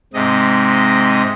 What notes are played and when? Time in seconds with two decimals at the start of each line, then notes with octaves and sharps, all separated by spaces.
0.14 G#2 C3 D#5